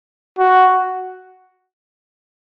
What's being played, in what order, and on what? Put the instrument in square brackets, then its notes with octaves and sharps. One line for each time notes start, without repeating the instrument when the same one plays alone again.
[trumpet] F#4